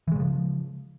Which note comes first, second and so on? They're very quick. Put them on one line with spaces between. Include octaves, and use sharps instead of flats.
E3 G#3 C#3 F3